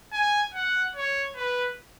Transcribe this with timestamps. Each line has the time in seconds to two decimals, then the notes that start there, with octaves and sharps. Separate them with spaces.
0.13 G#5
0.54 F#5
0.96 C#5
1.36 B4